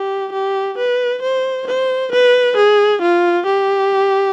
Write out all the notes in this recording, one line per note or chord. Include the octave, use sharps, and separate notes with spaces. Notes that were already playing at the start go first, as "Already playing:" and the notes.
Already playing: G4
G4
B4
C5
C5
B4
G#4
F4
G4